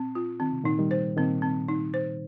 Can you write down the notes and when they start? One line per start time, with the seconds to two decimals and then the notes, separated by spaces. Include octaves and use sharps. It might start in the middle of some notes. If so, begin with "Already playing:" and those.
Already playing: A#2 C4
0.15 F4
0.40 D#3 C4
0.52 C3
0.64 A#2 D#3 D#4
0.79 D#3 G3
0.91 C5
1.17 A#2 D#3 C4
1.42 C4
1.68 D#4
1.94 C5